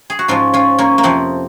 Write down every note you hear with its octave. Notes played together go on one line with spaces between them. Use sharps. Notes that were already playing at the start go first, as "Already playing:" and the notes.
G#4
F#4
G#2 F3 C#4 F4
C#4 F4
A#3 C#4
A#3
F2 C3 F3 C4